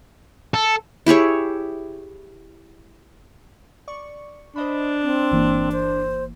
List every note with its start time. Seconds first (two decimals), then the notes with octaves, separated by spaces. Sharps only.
0.54 A4
1.06 E4 G4 G#4 C#5
3.88 D5 C#6
4.56 D4 C5 D#5 B5
5.03 C4
5.31 G1 E3 A#3
5.72 C5